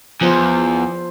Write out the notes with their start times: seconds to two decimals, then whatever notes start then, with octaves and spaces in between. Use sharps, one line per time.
0.21 E2 F3 F4 C5